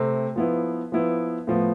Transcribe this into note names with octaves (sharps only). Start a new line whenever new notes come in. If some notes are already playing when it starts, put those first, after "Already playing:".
Already playing: C3 A3 C4
F3 B3 E4
F3 B3 E4
A2 F3 B3